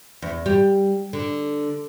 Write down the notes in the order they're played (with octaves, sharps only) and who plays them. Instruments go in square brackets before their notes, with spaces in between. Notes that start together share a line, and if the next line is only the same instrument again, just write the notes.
[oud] E2
G3
D3